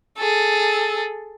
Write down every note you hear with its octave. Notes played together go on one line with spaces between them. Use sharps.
G#4 A4